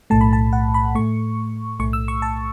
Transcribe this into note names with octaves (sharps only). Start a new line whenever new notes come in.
B1 A2 A3 A5
B5
A5
F#5
B5
A2 A3 C#6
B1 A2 A3 C#6
E6
C#6
A5